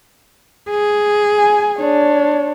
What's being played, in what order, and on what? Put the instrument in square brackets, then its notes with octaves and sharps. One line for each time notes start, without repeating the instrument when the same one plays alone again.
[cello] G#4
[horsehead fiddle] G#5
D4 C#5